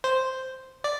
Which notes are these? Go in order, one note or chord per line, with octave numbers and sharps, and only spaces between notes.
C5
D5